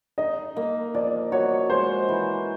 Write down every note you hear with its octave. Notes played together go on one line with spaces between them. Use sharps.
D#4 D#5
A#3
F3 D5
F#4 C#5
G#3 C5
E3